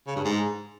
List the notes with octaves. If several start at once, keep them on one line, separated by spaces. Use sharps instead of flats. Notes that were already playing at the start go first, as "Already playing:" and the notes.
C#3
G2
G#2